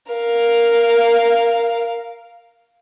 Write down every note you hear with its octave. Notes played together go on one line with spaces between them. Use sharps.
A#4 F5